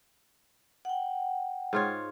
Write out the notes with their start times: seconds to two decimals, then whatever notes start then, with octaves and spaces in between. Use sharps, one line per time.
0.85 F#5 G5
1.73 G#2 F4 C#5